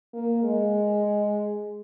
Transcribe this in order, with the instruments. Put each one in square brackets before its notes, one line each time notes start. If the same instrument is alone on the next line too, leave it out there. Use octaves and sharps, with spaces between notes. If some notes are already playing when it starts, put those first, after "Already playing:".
[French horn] A#3
G#3